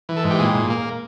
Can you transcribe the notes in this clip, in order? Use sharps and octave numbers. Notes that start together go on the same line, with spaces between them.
E3
A4
G#2
G4
A#2 G#4
A#2
A#3